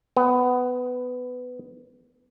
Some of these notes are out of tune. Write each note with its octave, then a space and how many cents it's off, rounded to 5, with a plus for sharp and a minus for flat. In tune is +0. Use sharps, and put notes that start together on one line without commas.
B3 +15